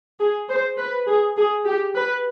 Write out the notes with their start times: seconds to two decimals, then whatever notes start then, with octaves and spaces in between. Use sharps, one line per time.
0.20 G#4
0.49 C5
0.78 B4
1.07 G#4
1.37 G#4
1.66 G4
1.96 B4